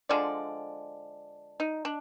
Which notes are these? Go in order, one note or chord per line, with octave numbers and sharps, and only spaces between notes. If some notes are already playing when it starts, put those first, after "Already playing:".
D3 F3 G#3 D5
D#4
D4